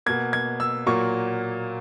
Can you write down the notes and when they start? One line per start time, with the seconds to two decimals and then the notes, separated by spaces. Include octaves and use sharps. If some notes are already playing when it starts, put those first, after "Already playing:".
0.06 B2 A#3 G#6
0.33 G#6
0.60 E6
0.86 A#2 F#3 A#3 C#6